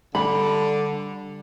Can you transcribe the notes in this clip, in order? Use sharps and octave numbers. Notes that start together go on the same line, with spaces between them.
D3 G3 B5